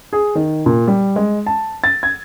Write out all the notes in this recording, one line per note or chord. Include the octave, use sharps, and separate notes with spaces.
G#4
D#3
A#2
G3
G#3
A5
A6
G#6